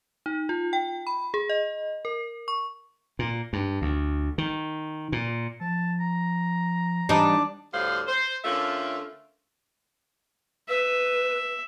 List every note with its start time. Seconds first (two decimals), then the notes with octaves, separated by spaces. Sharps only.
0.26 D#4
0.49 F4
0.73 G5
1.07 B5
1.34 G#4
1.49 D#5
2.05 A#4
2.48 C#6
3.19 A#2
3.53 G2
3.82 D2
4.38 D#3
5.12 A#2
5.60 F3 A5
6.00 A#5
7.09 E3 G3 D4 D#4
7.72 D2 A2 G3 C5 F5
8.06 C5
8.43 D3 A3 C#4 F4 A#4 E5
10.68 B4 E5